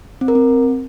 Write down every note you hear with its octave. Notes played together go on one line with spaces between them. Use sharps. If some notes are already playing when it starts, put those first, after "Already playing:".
C4
A#4
C4